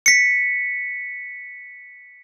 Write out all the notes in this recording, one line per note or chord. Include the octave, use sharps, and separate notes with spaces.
B6 C#7